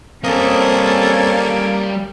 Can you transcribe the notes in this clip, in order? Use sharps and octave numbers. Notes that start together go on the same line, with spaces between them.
G3 A#3 C4 C#4 A4 D#5